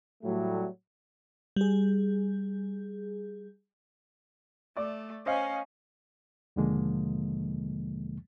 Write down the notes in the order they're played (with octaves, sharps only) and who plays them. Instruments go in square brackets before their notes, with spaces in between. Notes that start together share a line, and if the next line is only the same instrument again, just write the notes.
[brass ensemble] A2 F#3 G3 A3
[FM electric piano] G3 G#4
[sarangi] A3 [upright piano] D5 D6
[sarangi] C#4 [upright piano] C5 D#5 F5
[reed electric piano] D#2 B2 D3 F3 G#3 A#3